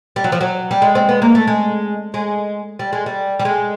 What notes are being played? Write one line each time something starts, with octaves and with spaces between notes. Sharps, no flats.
G3
F#3
F3
F#3
G3
G#3
C4
B3
A#3
A3
G#3
G#3
G3
G#3
G3
G3
G#3